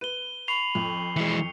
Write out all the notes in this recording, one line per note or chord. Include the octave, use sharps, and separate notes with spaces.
B4 D#7 G7
B5 C#6 C7 F7
F2
E3 G#3 C#7